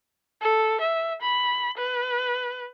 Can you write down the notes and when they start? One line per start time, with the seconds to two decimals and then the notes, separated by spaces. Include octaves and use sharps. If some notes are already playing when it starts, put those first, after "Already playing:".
0.42 A4
0.81 E5
1.22 B5
1.78 B4